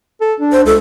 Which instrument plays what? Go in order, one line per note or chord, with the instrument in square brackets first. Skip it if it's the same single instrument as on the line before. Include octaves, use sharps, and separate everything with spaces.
[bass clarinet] A4
D4
[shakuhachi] C5
[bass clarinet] C#2 [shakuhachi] A4